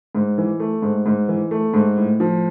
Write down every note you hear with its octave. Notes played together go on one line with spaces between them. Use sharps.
G#2
E3
A3
G#2
G#2
E3
A3
G#2
A2
F3